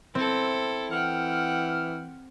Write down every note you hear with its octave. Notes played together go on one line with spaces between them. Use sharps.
C4 E4 A4
E3 F#5 G5 F6